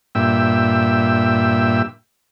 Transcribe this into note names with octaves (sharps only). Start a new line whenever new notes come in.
G2 A#2 E5 G5 E6